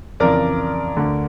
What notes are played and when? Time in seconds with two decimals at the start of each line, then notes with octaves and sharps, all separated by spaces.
0.20 F2 C#3 E3 A#4 D5
0.96 D2 D3